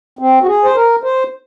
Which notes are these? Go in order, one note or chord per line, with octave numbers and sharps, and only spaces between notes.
C4
F#4
G#4
C5
A#4
C5